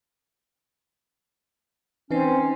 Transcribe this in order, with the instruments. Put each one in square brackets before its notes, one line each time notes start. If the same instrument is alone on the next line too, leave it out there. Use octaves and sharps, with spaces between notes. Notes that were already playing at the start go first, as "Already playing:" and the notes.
[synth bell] E3 B4 C7 [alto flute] C4 [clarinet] C#4 [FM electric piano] D#4